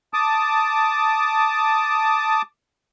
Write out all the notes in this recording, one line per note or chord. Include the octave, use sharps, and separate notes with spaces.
A5 D6 D#6